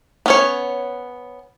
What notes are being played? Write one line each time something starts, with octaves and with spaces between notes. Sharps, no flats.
B3 C#4 C#5